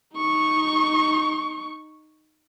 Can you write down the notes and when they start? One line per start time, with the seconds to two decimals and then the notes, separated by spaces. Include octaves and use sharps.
0.16 D#4 C#6